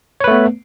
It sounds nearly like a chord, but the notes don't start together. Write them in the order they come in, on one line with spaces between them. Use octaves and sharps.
C#5 B4 A3 B3